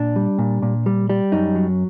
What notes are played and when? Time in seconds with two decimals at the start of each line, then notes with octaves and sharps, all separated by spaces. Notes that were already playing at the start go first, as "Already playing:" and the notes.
Already playing: A#2 D4
0.16 G3
0.38 A#2
0.62 A#2
0.86 G3
1.09 G3
1.32 F#2 D#4
1.55 F#3